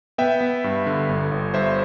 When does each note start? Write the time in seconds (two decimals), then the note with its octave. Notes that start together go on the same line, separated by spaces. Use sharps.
0.18 B3 E5 G5
0.41 B3
0.64 G2
0.86 D3
1.09 G1
1.32 G1
1.54 G2 C5 E5